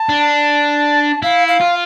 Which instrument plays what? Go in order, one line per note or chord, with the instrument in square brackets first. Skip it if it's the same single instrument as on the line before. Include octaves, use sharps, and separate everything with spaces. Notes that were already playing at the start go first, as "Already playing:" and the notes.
Already playing: [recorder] A5
[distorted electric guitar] D4
[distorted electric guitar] E4 [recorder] F5
[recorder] F5
[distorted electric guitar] F4